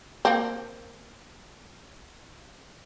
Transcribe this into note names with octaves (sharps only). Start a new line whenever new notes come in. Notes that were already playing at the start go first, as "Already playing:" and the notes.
A#3 C4